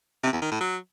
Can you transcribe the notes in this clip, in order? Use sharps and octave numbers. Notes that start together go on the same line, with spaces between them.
C3
E2
D#3
A2
F#3